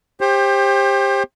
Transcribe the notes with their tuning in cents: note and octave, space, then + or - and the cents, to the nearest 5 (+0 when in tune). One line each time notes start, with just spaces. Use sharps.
G4 +20 C5 +30